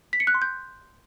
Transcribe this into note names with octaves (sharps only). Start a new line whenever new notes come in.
B6
C#7
F#6
C6
G6